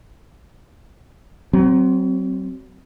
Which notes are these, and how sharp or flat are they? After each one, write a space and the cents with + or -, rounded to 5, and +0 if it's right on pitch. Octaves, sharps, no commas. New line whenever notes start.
F#3 +30 C4 +0